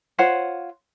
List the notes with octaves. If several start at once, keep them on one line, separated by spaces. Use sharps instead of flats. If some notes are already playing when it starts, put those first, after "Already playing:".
F4 C5 C#5 F#5